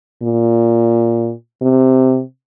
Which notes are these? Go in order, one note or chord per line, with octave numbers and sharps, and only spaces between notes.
A#2
C3